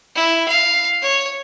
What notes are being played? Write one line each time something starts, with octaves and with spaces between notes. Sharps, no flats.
E4
F5
C#5